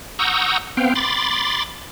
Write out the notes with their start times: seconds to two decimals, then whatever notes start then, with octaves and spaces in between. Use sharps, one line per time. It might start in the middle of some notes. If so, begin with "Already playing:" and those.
0.19 F#5 A#5 C#6 D#6 E6 G6
0.77 B3 C4 F5 G5
0.95 B5 C6 D6 A6